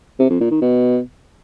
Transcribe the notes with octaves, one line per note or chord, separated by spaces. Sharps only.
C3
F2
A#2
D#3
B2